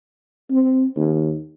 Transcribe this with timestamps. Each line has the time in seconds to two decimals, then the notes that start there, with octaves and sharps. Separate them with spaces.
0.51 C4
0.97 D#2